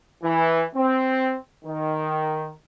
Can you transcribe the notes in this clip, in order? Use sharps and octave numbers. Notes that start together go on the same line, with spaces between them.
E3
C4
D#3